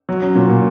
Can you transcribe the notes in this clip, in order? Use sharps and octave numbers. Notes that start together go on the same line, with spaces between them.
F#3
C#4
A#2
A#2